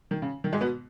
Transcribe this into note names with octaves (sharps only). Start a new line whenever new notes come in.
D#3
C#3
D#3
G#2 G#3
B2 B3